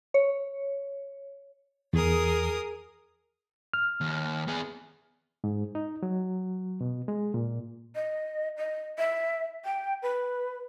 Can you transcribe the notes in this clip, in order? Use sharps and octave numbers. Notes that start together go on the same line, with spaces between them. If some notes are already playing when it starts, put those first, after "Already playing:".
C#5
E2 G#4 A#4 D#6
F6
D#2
B3 G#4
G#2
D#4
F#3
B2
G#3
A#2
D#5
D#5
E5
G5
B4